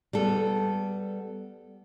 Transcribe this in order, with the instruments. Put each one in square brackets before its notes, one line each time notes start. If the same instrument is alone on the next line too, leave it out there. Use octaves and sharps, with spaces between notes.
[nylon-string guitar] G3 B3 A4